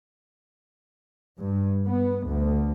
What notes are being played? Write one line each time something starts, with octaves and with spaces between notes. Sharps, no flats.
G2
B3
D2